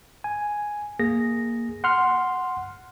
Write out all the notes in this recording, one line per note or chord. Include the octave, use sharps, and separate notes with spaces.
G#5
A#3 G#4 A#6
F#5 C6 F6